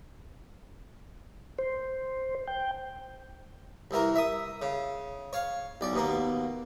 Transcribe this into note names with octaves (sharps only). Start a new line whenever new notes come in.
C5
G5
C2 E3 A#4
E5 D#6
C#3
C#5 F5
B1 D5
D#2 B2 A#3